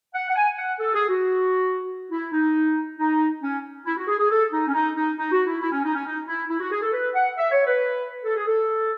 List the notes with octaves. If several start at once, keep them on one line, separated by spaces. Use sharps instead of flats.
F#5
F#5
G#5
F#5
A4
G#4
F#4
E4
D#4
D#4
C#4
E4
F#4
G#4
G#4
A4
D#4
C#4
D#4
D#4
D#4
F#4
E4
E4
C#4
D#4
C#4
D#4
E4
E4
F#4
G#4
A4
B4
F#5
E5
C#5
B4
A4
G#4
A4